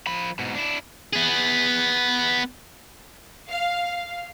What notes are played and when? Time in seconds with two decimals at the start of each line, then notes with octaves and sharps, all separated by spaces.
0.07 F3 B5
0.39 G#2 B2
0.54 D4 E4
1.13 B3 G#4
3.51 F5